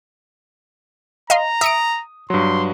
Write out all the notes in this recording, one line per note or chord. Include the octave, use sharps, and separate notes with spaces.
D#5 F5 A#5 C6
E5 D#6 C#7 D7
G2 F#3 C6